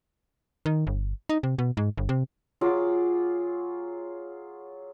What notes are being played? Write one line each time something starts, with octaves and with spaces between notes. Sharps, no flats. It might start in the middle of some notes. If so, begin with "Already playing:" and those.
D#3
G1
D#4
C3
B2
G#2
G1
C3
F#3 F4 G#4 D6